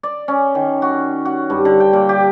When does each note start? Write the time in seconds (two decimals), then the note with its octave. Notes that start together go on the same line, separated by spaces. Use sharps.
0.03 D5
0.28 C#4
0.55 D#3
0.82 F#4
1.25 F#4
1.50 G2
1.65 D3
1.80 G5
1.93 A#2
2.09 G4